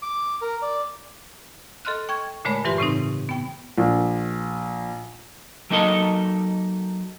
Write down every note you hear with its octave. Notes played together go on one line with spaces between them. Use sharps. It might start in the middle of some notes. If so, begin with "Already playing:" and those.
D6
A#4
D5
A4 D#5 C6 F6 F#6
G5 C#6 G#6
A#2 D3 G#3 A3 C#5 B5
G2 E3 F4 G4 B4 C6
A2 C#3 C4 D#4
B3 G5
A#1
F#3 A#3 D#4 A4 D#5